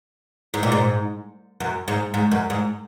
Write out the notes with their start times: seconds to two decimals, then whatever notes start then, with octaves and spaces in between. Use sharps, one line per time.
0.54 G#2
0.63 A#2
0.72 G#2
1.60 F#2
1.88 G#2
2.14 G#2
2.32 F#2
2.50 G#2